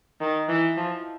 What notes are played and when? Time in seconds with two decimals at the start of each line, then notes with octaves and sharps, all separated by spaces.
0.21 D#3
0.49 E3
0.77 F3